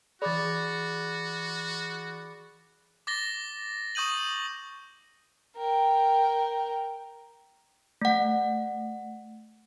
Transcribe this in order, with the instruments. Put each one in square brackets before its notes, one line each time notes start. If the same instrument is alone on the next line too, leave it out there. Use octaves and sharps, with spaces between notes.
[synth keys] E3 G#4 [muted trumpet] F#4 [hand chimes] D5 [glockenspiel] B5 D6 A6
[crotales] D6 A6 A#6 G7
C#6 D#6 G6 D#7 F#7
[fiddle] A#4 G5
[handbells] A3 F#5